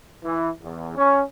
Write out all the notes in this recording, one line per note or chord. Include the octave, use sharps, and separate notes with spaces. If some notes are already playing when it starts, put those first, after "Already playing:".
E3
E2
C#4